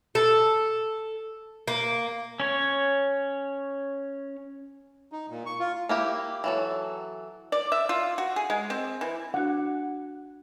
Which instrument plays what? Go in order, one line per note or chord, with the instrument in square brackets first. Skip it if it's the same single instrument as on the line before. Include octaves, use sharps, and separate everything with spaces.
[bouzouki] A4
A#3
[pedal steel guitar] C#4 C#5
[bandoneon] D#4
A#2
C#6
F4
[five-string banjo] A#3 E4 G4
E3 F#3 A4
[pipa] D5
E5
F4
F#4
G#4
G#3
C4
E3
[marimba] D4 F#4 [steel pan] F#5